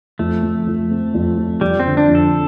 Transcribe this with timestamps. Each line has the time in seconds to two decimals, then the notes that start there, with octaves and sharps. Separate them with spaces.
0.19 F2 A3
0.42 F2
0.67 F3
0.91 C4
1.14 F2
1.38 F2
1.61 F2 G3
1.80 C4
1.85 D3
1.97 D4
2.09 F2
2.15 A4